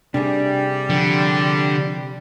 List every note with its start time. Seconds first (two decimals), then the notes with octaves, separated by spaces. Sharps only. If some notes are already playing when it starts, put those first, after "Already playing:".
0.14 C3 G3 A3 D4 G#4
0.90 D3 F3